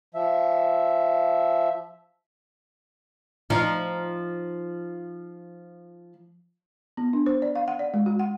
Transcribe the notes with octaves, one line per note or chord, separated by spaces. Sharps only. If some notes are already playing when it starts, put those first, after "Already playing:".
F3 E5
F3 D#4
B3
D4
C5
D5
F5
F#5
D5
G#3
F#4
F#5